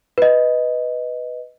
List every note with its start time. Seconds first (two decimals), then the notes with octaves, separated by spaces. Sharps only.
0.18 B4 D#5